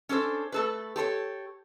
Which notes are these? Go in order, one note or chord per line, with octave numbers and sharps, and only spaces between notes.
C#4 D4 A4 C5
A3 A4 B4
G4 A4 C5 C#5